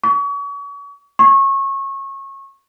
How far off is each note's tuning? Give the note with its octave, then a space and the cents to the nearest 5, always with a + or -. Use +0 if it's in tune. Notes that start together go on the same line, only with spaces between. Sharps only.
C#6 +40
C#6 -25